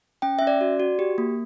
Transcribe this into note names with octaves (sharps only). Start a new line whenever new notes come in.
C#4 G5
C#4 E5
D5
F#4
F#4
G4
A#3